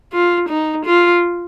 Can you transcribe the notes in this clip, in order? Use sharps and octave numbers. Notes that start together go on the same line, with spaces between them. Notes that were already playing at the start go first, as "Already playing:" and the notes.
F4
D#4
F4